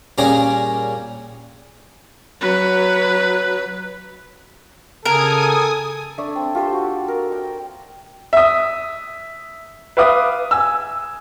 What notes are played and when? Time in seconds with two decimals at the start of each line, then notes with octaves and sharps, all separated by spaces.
0.18 A#2 G3 C#4 G#4 A#5 D6
2.41 F#3 B4
5.05 C#3 A4 A#4 G#5 D#6
6.18 A3 D4 D5 E5
6.36 C4
6.55 F4 G4 A4 C5
6.73 F#4
7.08 A#4
7.32 G5
8.33 E5 D#6
9.97 B4 E5 F5 D6 D#6
10.51 G#5 E6